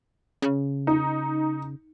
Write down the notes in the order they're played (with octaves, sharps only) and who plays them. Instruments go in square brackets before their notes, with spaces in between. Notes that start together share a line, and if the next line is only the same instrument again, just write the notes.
[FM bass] C#3
[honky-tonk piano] D#4